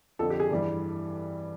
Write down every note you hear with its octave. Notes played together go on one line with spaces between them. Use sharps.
F2 D3 F3 A4
G4
G#4
G2 E3 G3